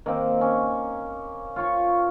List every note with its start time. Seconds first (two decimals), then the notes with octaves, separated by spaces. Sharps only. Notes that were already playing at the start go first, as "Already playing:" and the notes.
0.06 D#3 A#3 C4
0.41 C#4
1.56 F4 C#5 C#6